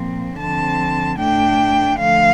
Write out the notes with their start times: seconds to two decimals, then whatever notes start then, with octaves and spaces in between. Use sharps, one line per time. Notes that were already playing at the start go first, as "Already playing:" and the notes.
Already playing: A#2 F3 C4
0.38 D3 F3 C4 A5
1.19 A2 A3 D4 G5
1.99 D3 F3 A3 F5